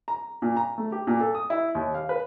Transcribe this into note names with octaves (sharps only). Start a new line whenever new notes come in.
A#5
A#2
A#5
A3
G4
A#2
A4
D#6
E4
D#2
F5
B4